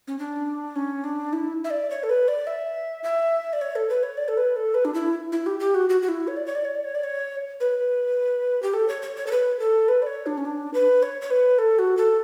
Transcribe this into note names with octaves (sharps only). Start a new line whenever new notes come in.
C#4
D4
C#4
D4
E4
E5
D5
C#5
A4
B4
D5
E5
E5
D5
C#5
A4
B4
C#5
D5
A4
B4
A4
B4
D4
E4
E4
G4
G4
F#4
F#4
F#4
E4
C#5
D5
C#5
D5
C#5
D5
C#5
D5
C#5
B4
G4
A4
C#5
C#5
C#5
A4
B4
A4
B4
D5
C#5
D4
C#4
D4
B4
C#5
C#5
B4
A4
F#4
A4